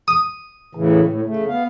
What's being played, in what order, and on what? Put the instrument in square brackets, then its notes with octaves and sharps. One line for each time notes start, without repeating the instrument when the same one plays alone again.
[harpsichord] D#6
[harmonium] A2 C#3 E3
A2
C#3 A3
B3 F5